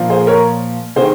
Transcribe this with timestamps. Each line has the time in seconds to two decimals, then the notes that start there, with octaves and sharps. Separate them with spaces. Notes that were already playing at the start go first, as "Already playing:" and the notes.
Already playing: A#2 F3 A#3
0.10 G#4 C5
0.27 A#4 C#5
0.96 C3 D#3 G#4 C5